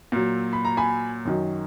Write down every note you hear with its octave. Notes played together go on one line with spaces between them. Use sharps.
A#2 F#3
B5
A#5
G#5 B5
F#2 D#3 F#3